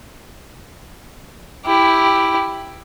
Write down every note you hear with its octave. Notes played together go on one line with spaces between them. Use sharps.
E4 G4